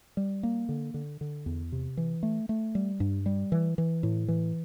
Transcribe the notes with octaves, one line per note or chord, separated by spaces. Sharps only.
G3
A#3
D3
D3
D3
E2
C3
E3
A3
A3
G3
G2
G3
E3
E3
A2
E3